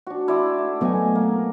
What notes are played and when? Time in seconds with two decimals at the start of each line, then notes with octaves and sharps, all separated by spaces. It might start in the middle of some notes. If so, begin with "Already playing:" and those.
0.07 D4 F#4
0.28 E4 D5 C6
0.58 A3
0.81 F#3 A3 B3 A4 D#5 G#5
1.15 A#3